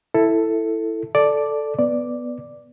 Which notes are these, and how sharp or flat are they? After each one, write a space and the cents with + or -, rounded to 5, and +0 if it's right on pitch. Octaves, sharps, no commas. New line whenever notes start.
E4 +0 A4 +10
A4 +0 D5 +0
B3 +0 D5 +0